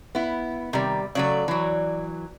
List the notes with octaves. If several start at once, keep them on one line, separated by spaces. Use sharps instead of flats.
B3 E4
C3 D#3 G3
C#3 F#3 A3 D5
E3 F#3